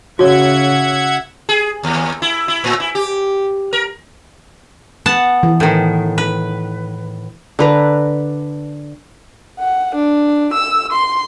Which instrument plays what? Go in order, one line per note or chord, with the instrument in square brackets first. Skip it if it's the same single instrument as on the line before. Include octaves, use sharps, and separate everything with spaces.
[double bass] C#3 [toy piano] F#4 C#5 [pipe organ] E5 F#5 G#6
[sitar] G#4
D#2
E4
E4
A2
E4
G4
A#4
[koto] B3 F#5 A5
[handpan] E3
[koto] A2 D#3
B4
[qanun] D3 B4 A#5
[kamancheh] F#5
D4
E6
C6